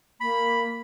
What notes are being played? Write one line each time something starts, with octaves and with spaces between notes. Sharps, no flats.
A#3 B5